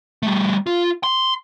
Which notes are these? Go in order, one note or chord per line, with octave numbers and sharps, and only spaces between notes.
G3 A3
F4
C6